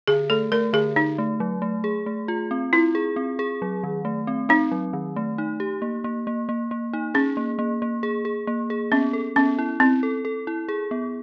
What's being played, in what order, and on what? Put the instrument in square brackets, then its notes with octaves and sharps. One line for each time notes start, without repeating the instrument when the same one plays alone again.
[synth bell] D3 [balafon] G#4
[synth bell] A3 [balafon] A4
[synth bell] A3 [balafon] A#4
[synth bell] D3 [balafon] G#4
[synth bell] D3 [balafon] D#4
[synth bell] A3
F#3
A3
G#4
A3
F4
C4
[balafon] E4 [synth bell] F4
[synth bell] G#4
C4
G#4
F#3
D#3
A3
C4
[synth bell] C4 [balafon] D#4
[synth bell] F#3
D#3
A3
D#4
G4
A#3
A#3
A#3
A#3
A#3
D#4
[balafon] C#4 [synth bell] G#4
[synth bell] A#3
A#3
A#3
G#4
G#4
A#3
G#4
[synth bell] B3 [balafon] C#4
[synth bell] A4
[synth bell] B3 [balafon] C#4
[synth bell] E4
[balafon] C4 [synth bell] E4
[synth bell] A4
A4
E4
G#4
B3